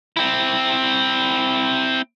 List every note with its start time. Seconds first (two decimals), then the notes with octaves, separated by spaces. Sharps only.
0.17 C4 E4